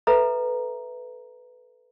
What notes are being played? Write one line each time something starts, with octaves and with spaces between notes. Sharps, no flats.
A4 B4 E5 A#5